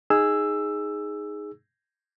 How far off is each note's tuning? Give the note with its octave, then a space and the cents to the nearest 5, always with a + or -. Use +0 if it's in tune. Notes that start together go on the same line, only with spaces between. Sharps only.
D#4 +0 G#4 +0 E6 +10